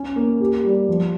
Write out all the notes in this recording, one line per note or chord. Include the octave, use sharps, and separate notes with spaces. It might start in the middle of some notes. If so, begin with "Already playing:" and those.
Already playing: C#4
A#3
G4
G3
F3